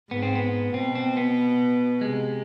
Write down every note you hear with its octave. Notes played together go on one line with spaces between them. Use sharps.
G#2 B3
C4
B3
B2 C4
C4
B3
C3 G#3